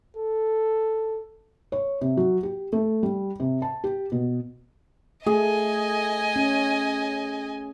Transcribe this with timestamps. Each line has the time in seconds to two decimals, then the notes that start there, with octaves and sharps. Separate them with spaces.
0.17 A4
1.72 C#5
2.01 C3
2.17 F#3
2.43 G4
2.73 A3
3.03 G3
3.40 C3
3.62 A5
3.84 G4
4.12 B2
5.26 A3 G#4 D#5 G#5
6.36 C#4